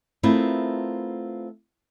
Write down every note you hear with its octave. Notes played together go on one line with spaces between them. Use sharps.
A3 B3 C4 E4 F4 A#4